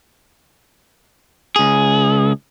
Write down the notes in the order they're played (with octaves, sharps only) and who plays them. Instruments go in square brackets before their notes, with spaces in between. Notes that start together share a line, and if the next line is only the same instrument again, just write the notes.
[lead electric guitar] C#2 G#4